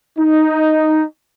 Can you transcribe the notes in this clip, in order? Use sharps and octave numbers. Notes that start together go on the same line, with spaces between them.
D#4